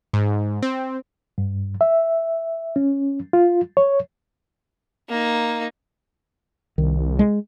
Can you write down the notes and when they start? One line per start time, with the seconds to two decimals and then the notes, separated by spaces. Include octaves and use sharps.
0.13 G#2
0.62 C4
1.38 G2
1.81 E5
2.76 C#4
3.33 F4
3.77 C#5
5.09 A#3 D#4
6.78 C2 D#3
7.19 G#3